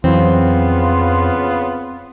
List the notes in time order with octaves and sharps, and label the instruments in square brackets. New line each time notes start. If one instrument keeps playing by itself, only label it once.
[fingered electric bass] F2 [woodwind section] C#3 B3 F4 [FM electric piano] E3 F#3 [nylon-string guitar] C4